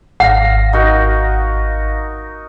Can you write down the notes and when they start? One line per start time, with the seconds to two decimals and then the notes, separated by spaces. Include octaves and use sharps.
0.20 G#1 F5 F#5 A#6
0.73 D#4 F#4 A#4